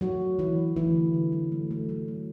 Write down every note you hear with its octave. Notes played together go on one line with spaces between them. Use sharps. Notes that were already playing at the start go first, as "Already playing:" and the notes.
F#3 A3 F#4
A3
D3 E3 E4
F#3
E3 A3 E4
D3
D3
F#3
A3
A3
F#3
A3